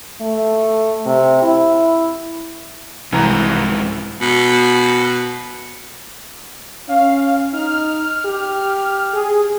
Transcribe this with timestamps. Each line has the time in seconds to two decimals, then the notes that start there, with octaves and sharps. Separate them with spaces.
0.21 A3
1.06 C3
1.42 E4
3.12 C2 F2 G#2 E3 A#5
4.21 B2
6.89 C#4 F5
7.53 D#4 F6
8.25 G4
9.13 G#4